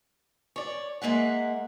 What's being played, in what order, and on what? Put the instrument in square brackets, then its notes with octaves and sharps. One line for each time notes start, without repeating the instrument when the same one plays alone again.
[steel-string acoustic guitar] C#5 D5
G#3 A#3 E5 F#5